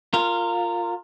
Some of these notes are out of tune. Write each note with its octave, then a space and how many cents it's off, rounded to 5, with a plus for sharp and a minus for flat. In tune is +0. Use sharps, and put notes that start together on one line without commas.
F4 +0 A#4 -20